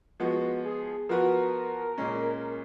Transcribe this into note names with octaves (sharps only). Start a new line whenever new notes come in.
F3 G#3 B3 F#4
G#4
F3 B3 F#4 A#4 B4
A#2 G#3 C#4